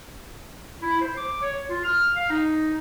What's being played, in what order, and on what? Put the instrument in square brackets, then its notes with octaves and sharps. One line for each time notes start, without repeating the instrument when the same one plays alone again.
[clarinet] E4
C5
D6
C#5
F4
F6
F5
D#4